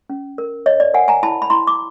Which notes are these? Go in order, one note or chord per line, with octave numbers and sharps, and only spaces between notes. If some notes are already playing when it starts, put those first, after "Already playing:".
C#4
A#4
C#5 D#5
D5
A#4 F#5 G#5
G#5 A#5
E4 A5 B5
B5
E4 A#5 C6
D6